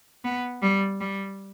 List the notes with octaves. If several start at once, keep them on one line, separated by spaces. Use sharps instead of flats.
B3
G3
G3